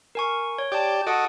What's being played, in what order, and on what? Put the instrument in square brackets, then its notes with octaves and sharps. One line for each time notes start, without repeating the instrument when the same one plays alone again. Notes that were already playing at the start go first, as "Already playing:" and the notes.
[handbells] A#4 G#5 C#6
C#5
[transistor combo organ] G4 D5 [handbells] A5 D6
[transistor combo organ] F#4 A4 D#5 [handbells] F#5 D7